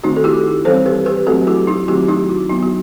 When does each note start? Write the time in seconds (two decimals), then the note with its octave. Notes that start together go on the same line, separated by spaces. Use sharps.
0.04 D#3 A3 C4 D#4 F#4
0.16 A4
0.24 E4 G4
0.65 E3 G3 C4 A4 C5
0.86 G4 B4
1.06 G4 B4
1.26 F#3 A3 C4 F#4 A4
1.47 E4 G4
1.67 D#4 F#4
1.88 D#3 F#3 A3 C4 E4 G4
2.08 D#4 F#4
2.29 E4
2.49 F#3 B3 D#4
2.63 F#4